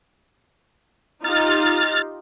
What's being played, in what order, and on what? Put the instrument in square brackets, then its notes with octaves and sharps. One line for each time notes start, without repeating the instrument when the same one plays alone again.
[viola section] D#4 F4 G4 [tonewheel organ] F6 A6